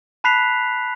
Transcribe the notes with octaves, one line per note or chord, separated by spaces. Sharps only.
A5 B5 F#6 B6 C7 F7